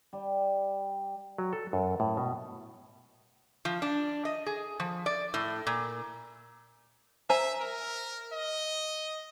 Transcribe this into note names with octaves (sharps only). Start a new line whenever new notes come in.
G3
F#3
A4
F#2
A2
B2
F3
D4
D#5
G#4
F3
D5
A2
A#2
C5 E5 G#5 A#5
A#4
D#5